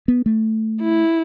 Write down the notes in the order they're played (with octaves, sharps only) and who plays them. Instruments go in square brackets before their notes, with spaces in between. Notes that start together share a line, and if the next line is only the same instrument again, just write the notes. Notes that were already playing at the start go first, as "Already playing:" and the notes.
[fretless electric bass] B3
A3
[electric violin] E4